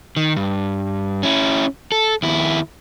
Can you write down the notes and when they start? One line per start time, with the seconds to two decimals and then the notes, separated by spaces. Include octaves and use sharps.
0.16 D#3
0.36 G2
1.23 C#4 E4
1.92 A4
2.23 D#2 E4